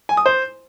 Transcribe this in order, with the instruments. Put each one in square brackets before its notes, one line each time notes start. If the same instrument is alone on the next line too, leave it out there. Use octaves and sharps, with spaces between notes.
[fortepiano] G#5
D#6
C5